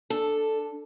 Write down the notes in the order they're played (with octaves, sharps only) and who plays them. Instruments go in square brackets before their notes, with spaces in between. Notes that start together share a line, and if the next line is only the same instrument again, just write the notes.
[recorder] D4 [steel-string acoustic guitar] A4